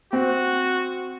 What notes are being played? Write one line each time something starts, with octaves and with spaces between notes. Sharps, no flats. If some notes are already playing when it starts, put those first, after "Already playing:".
C4 F#4